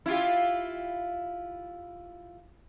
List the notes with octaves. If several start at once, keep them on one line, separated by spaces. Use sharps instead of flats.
E4 F4 G4